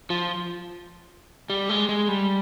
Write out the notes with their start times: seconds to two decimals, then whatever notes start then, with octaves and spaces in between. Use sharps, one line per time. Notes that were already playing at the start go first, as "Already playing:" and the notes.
0.10 F3
1.50 G3
1.69 G#3
1.89 G#3
2.08 G3